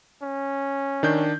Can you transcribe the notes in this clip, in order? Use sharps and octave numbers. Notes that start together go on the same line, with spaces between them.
C#4
D#3 D4 G6